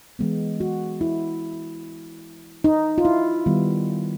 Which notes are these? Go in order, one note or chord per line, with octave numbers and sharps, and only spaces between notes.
E3 G#3 B3
F#4
E4
D#4
F4
E4
D#3 G3 B3